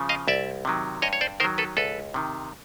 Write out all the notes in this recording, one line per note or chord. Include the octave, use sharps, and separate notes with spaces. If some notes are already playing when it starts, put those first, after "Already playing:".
Already playing: C#3 F3
D#5 F5
C2 D5 E5
C3 D#3 F#3
G2 C#5 D#5
C#5
C5 D5
D#3 F#3 A#4 C5
A4 B4
C#2 A4 B4
C3 D#3